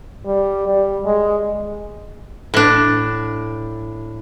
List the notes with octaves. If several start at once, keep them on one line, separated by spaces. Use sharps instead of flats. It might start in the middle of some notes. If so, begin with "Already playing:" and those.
G3
G3
G#3
A2 D4